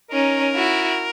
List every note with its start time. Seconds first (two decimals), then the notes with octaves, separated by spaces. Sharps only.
0.11 C#4 D#4 A#4
0.55 E4 F#4